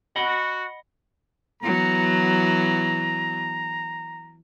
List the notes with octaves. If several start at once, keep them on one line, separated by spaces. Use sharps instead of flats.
F#4 D#5 F#5 B5
E3 F#3 B3 A#5